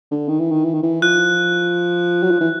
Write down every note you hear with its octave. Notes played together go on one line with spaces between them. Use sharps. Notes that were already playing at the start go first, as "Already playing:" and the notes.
D3
D#3
E3
D#3
E3
D#3
E3
F3 F#6
F#3
F3
E3